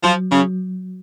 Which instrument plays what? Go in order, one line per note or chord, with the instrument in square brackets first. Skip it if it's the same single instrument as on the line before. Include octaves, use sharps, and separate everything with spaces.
[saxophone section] F3 [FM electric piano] F#3
[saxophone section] C#3 [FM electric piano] F#3